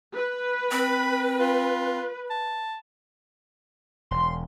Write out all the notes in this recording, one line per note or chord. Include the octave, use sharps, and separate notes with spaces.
B4
C4 B5
F4
A5
E1 C6